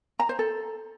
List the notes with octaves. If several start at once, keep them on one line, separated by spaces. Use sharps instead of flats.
A#5
C5
A4